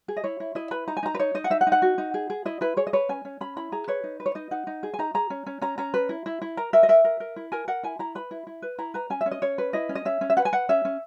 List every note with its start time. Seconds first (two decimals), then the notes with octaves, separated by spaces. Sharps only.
0.08 G#4
0.17 D#5
0.24 E4 C#5
0.40 E4
0.55 E4 D#5
0.71 B4 B5
0.87 D#4 A#5
0.97 G#5
1.03 D#4 A#5
1.15 B4
1.19 D#4 C#5
1.35 D#4 D#5
1.44 F#5
1.50 D#4 E5
1.61 F#5
1.67 D#4
1.72 F#5
1.82 F#4
1.98 D#4
2.14 G#4
2.30 G#4
2.45 E4 D#5
2.61 E4 B4
2.77 G#4 C#5
2.87 D#5
2.93 B4 C#5
3.09 C#4 G#5
3.25 C#4
3.41 C#4 B5
3.57 E4 B5
3.72 G#4 A#5
3.88 B4 C#5
4.04 D#4
4.20 B4
4.26 C#5
4.35 D#4 D#5
4.51 D#4 F#5
4.67 D#4
4.83 G#4
4.94 G#5
4.99 D#4 A#5
5.14 G#4 A#5
5.30 C#4
5.46 C#4
5.61 C#4 A#5
5.78 C#4 A#5
5.94 B4
6.09 E4
6.26 E4
6.42 E4
6.57 A#4 A#5
6.73 A#4 E5
6.83 D#5
6.89 A#4 E5
7.04 A#4
7.20 A#4
7.36 E4
7.52 A#4 G#5
7.68 A#4 F#5
7.83 E4 G#5
7.99 E4 A#5
8.15 B4 B5
8.31 E4
8.47 E4
8.62 B4
8.78 E4 A#5
8.94 B4 A#5
9.10 C#4 G#5
9.21 E5
9.26 C#4
9.31 D#5
9.42 C#4 C#5
9.58 B4
9.73 E4 D#5
9.89 C#4
9.95 D#5
10.05 C#4 E5
10.21 C#4
10.30 E5
10.37 B4 F#5
10.45 G#5
10.53 B4 F#5
10.69 C#4 E5
10.85 C#4